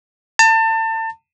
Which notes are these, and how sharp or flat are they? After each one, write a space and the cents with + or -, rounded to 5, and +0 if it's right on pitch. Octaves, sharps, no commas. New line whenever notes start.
A5 +30